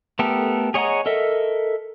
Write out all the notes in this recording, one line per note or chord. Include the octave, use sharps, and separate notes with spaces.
A3 B3 G4 A4 A#4
G#4 C#5 D#5 F#5 A#5
A4 A#4 D#5 E5